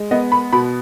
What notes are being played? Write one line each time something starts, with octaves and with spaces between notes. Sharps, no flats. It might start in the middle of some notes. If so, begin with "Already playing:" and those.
Already playing: G#3
B3 D#5
B5
B2 B5